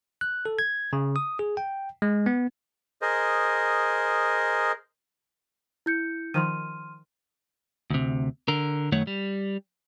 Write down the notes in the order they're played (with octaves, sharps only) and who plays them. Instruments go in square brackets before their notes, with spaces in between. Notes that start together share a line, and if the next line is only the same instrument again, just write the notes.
[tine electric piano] F#6
A4
G#6
C#3
D#6
G#4
G5
G#3
B3
[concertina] G#4 A#4 C5 D#5
[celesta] E4 G6 C#7
[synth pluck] D#3 F3 [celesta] C6 F6 D#7
[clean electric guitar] D2 C3
D3 A#4
F#2 D#3 A3 C#5 F#5
G3